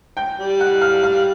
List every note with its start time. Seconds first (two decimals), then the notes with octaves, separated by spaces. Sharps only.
0.17 G5 G6
0.39 G3
0.60 F#5 F#6
0.81 F5 F6
1.03 F5 F6